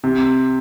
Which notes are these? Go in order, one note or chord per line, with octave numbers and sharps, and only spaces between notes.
C3